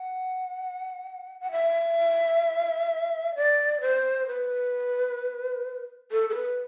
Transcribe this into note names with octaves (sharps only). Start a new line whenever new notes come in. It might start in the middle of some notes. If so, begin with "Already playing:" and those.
Already playing: F#5
F#5
E5
D5
C5
B4
A4
A4
B4